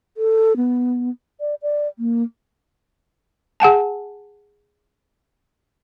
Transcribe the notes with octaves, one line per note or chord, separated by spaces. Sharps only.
A4
B3
D5
D5
A#3
G#4 F#5 G#5 A5